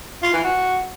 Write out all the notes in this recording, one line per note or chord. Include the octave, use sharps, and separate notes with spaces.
F4
E3
F#4